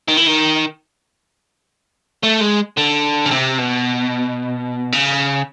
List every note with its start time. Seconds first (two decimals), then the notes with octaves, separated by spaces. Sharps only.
0.08 D#3
0.17 E3
0.27 D#3
2.24 A3
2.41 G#3
2.78 D3
3.26 C#3
3.31 C3
3.58 B2
4.92 C#3